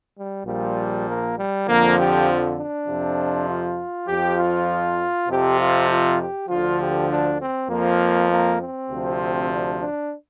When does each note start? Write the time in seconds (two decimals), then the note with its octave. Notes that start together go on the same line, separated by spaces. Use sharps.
0.16 G3
0.46 A#1 A#2 F3 G3
1.06 A#3
1.37 G3
1.67 F2 D3 F3 A#3
1.97 G4
2.57 D4
2.87 F2 C3 F3
3.47 F4
4.08 F2 F3 G4
4.37 F4
5.29 F2 C3 F3 G4
5.58 F4
5.89 F4
6.19 G4
6.49 D2 D3 F3 F4
6.79 G4
7.08 D4
7.40 C4
7.69 F2 F3 A#3
8.29 A#3
8.60 C4
8.90 D2 C3 F3
9.50 D4
9.80 D4